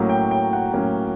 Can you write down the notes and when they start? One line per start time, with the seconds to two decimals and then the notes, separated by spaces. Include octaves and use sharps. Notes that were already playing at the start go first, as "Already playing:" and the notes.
Already playing: A2 F#3 A#3 C#4
0.09 G5
0.31 G5
0.53 F#5
0.74 A2 F#3 A#3 C#4